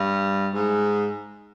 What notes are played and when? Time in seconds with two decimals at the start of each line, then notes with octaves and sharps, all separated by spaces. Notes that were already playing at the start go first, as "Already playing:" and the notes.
Already playing: G2
0.54 G#2